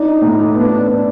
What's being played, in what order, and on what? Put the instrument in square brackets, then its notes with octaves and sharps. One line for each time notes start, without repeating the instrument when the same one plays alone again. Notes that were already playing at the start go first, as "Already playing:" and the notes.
Already playing: [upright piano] D4 [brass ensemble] D#4
[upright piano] A2
[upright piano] B3 [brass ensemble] D4
[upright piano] D4